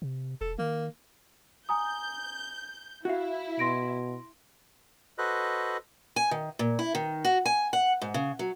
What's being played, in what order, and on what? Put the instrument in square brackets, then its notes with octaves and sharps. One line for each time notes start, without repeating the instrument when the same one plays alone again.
[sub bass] C3
[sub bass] E1 [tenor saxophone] A4
[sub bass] D#3 [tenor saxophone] A#3
[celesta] G#5 A#5 D#6 [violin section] G6
[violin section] E4 [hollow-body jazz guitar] F#4 F5
[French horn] B2 [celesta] C6 A#6 D7
[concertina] F#4 A4 B4 C5 D#5 F#6
[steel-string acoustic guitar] G#5
D#3
A#2
E4
D#3
F#4
G#5
F#5
G#2
C#3
F#3